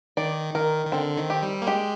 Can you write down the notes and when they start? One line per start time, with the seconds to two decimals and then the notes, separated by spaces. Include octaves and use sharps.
0.17 D#3 D5
0.54 D#3 A#4
0.86 D#3
0.92 D3 C4
1.17 D#3
1.30 G4
1.42 G3
1.62 A#3
1.67 G#3 G4